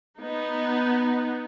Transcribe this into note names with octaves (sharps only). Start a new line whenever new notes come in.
B3 D#4